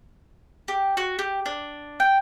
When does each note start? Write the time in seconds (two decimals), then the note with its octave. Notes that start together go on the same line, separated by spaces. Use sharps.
0.68 G4
0.97 F#4
1.19 G4
1.46 D4
2.00 G5